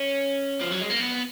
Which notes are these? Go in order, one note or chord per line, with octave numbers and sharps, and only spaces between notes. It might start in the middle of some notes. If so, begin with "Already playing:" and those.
Already playing: C#4
F3
F#3
G#3
A#3
B3